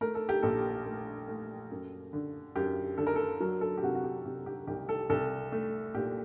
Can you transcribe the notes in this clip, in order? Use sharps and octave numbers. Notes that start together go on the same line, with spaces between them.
A3 A#4
A4
G4
A#1 A4
A3
A3
F#2
D3
F#2 G4
D3 A4
A#4
A4
F#3 A#4
A4
G4
C3 F#4
F#4
G4
C3 G4
G4
C2 G4
A4
C2 A4
A3
A#2 G4